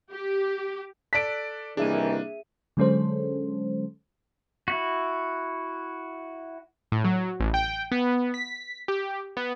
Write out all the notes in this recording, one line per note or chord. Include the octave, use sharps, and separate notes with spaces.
G4
A4 D5 A5 F#6 B6 D7
C2 D#3 E3 A#3 D4 G#4 E5 D#7
D3 F#3 G#3 C#4 A4 C5
E4 F#4
A2
F#3
A1
G5
B3
B6
G4
B3